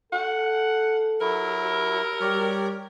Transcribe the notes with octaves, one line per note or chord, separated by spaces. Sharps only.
A4 F#5
F#3 E4 A#4
G3 G4 C#5 D5